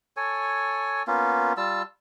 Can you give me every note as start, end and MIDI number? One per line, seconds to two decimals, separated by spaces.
0.17 1.03 69
0.17 1.03 73
0.17 1.03 80
1.07 1.53 58
1.07 1.53 59
1.07 1.53 61
1.07 1.53 65
1.57 1.82 55
1.57 1.82 65
1.57 1.82 81
1.57 1.82 88